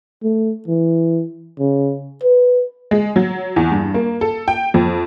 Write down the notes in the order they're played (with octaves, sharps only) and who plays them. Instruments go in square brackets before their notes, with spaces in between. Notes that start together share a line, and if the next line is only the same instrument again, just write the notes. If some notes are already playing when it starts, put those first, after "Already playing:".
[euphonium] A3
E3
C#3
B4
[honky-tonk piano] G#3
F#3
E2
G2
A#3
A4
G5
F2